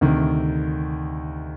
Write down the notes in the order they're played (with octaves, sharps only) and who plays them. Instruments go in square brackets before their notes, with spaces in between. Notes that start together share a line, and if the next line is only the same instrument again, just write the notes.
[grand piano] D2 C3 D#3